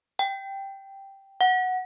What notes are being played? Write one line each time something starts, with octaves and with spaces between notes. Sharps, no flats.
G5
F#5